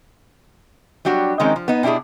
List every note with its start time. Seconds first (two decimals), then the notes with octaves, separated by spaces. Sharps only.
1.05 F#3 G3 D4 F#4 G4
1.40 D#3 F3 G#3 C4 C#4 D#4
1.56 F3
1.68 B3 D#4
1.83 B2 D4 E4 G4 G#4